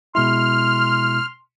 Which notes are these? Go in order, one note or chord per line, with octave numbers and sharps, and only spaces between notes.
B2 G#3 E4 C6 F6